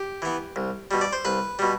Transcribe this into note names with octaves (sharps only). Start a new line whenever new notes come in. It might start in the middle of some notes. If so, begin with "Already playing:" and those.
Already playing: G4
E3 B3
C2
B2 G3
D5
C5
C2 B4
B2 G3